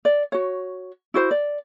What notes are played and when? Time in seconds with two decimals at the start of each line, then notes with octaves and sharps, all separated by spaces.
0.05 D5
0.32 F#4 C#5
1.14 E4 F#4 C5
1.31 D5